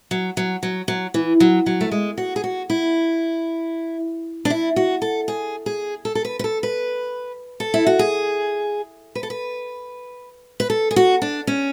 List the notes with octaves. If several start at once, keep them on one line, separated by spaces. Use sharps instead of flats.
F#3
F#3
F#3
F#3
E3
F#3
F#3
A3
G#3
F#4
G#4
F#4
E4
D4
E4
F#4
A4
G#4
G#4
A4
A4
B4
B4
A4
B4
A4
E4
F#4
G#4
B4
A4
B4
B4
A4
G#4
F#4
D4
C#4